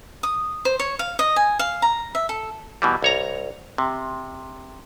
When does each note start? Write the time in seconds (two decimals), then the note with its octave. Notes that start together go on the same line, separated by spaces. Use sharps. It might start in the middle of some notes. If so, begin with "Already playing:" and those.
0.23 D#6
0.65 C5
0.80 C#5
0.99 F5
1.19 D#5
1.36 G#5
1.59 F5
1.82 A#5
2.15 E5
2.29 A4
2.82 B2 E3 G3
3.02 C2 C#5 A#5
3.78 C3